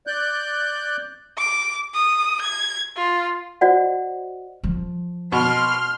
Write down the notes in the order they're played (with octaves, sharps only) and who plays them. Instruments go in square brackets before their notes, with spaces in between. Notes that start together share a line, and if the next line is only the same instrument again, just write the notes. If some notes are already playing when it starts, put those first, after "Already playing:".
[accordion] D5 F#6 G6
[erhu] D6
D#6
G#6
F4
[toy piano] F#4 C5 D5 D#5 F#5
[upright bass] F3
[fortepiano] B2 [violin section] C6 F6